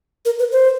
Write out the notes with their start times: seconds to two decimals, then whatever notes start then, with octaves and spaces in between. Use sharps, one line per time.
0.25 A#4
0.39 B4
0.52 C5